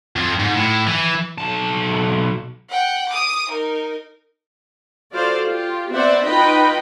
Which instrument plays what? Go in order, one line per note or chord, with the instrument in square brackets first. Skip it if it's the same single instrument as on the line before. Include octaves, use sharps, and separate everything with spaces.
[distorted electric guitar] F2
G#2
A2
E3
B1 A5
[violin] F#5 G5
D6 D#6
D#4 A#4
[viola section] F4 F#4 A4 C5 D5 F5
F4 G4
B3 C4 C5 D5 E5 F#5
D#4 F4 B4 D#5 G5 B5